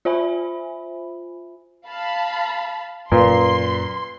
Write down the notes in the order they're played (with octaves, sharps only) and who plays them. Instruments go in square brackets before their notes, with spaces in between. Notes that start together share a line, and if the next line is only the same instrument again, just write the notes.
[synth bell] F4 C5 E5 G#5 B5
[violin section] F5 A5 B5
[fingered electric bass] F#2 C#4 [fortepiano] A#2 [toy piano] B4 D5 F5 [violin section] C6